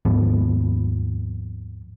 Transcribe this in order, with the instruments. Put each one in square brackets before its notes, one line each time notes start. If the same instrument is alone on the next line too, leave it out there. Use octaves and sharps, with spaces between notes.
[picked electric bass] D#2 G#2 F3 B3